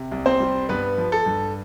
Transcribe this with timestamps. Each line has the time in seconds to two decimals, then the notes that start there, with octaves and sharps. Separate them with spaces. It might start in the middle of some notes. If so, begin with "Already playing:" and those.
Already playing: C3
0.11 C2
0.26 C4 C5
0.40 G3
0.69 G2 B3 B4
0.98 F3
1.12 A4
1.26 G2